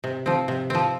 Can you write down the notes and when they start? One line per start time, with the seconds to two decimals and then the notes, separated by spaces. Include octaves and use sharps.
0.04 C3
0.26 F3 C4
0.48 C3
0.70 F3 C4